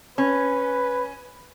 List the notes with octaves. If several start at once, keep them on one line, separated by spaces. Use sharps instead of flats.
C#4 B4